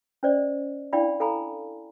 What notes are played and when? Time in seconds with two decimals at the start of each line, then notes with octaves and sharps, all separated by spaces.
0.23 C#4 C5 D5 D#5
0.93 D4 E4 D5 F5 G5 B5
1.20 A4 F5 G#5 A#5 B5